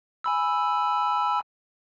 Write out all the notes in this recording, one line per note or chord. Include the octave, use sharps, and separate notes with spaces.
G#5 B5 E6